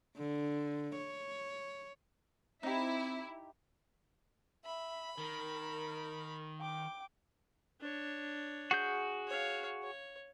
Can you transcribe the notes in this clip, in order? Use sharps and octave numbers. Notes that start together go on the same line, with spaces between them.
D3
C#5
C4 D#4 E4 G4
E5 B5
D#3 A#4
G5 D6
D4 C#5
F#4 G#4 G6
C#5 F5
C#5